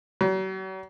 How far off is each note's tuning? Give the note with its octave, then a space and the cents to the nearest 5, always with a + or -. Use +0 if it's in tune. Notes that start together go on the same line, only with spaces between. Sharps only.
F#3 +40